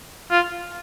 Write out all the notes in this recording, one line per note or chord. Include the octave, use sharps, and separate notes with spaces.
F4